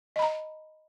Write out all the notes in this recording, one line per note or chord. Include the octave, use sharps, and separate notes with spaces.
D#5 A#5 B5